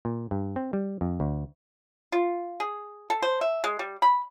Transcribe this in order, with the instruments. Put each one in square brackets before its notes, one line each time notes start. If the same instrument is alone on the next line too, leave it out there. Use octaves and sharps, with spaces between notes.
[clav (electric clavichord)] A#2
G2
C4
G3
F2
D2
[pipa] F4
G#4
A4
C5
E5
G#3
G3
B5